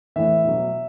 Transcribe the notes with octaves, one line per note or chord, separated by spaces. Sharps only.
A2 E3 E5
B2 F#3